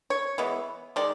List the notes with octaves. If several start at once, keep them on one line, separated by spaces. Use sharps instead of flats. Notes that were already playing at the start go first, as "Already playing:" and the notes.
C#5
E3 G#3 B3
D#3 G#3 D5